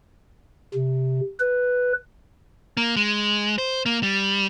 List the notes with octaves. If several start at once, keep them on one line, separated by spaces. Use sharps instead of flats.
C3
B4
A#3
G#3
C5
A#3
G3